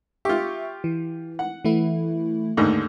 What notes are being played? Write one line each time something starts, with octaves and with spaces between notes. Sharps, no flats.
F4 G4 E5 C#6
E3
F#5
E3 A3 E4
D#2 G#2 D3 A3